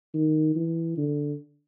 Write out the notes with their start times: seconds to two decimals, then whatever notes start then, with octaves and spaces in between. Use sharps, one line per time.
0.14 D#3
0.56 E3
0.97 D3